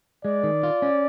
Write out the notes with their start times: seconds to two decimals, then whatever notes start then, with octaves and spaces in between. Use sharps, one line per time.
0.25 G#3 D5
0.44 D#3
0.63 F4
0.82 C#4